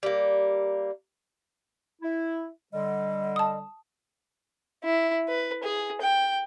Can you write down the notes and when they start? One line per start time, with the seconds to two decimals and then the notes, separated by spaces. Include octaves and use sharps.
0.03 G3 A#3
2.01 E4
2.73 D3 G3 D#5
3.36 A5 D#6
4.84 E4
5.28 B4
5.63 G#4
6.01 G5